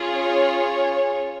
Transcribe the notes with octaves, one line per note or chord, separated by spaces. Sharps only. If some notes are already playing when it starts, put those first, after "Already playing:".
Already playing: C#4 F4 G#4
C#5